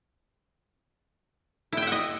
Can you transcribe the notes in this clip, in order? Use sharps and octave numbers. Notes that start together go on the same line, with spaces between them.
E4 D#5 E5 F#5 G5